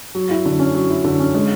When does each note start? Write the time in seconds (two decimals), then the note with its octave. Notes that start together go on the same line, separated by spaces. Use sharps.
0.15 F#3
0.31 E4
0.45 D3
0.59 C#4
0.74 F#3
0.90 E4
1.04 D3
1.20 C#4
1.34 G#3